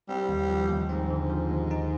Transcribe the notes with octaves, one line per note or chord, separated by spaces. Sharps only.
G3 C4
D#2
F3
D#2
G#2 C4
D3
F3
D#2
D#4